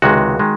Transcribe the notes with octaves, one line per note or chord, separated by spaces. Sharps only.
C#2 C3 D#3 G#3 F#4
D#3 G#3